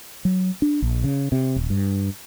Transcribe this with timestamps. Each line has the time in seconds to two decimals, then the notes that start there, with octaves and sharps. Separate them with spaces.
0.25 F#3
0.62 D4
0.82 A#1
1.04 C#3
1.32 C3
1.56 D#1
1.70 G2